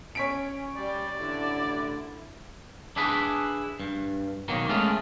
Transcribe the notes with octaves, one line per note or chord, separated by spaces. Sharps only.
C#4 C#5 B6 D7
G3 D5
A1 D3 E4
D4 E4 G#4 B4
G2
B2 D#3 F#3 A#3
G#3 A3 C#4 F4 G#4 A#4